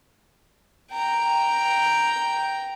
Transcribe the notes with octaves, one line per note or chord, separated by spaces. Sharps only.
G5 A#5